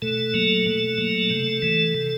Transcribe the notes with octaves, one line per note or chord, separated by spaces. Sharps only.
B2 A3 A4
F#3 A#3
B2
F#3 A#3
C3
E3 A3
C3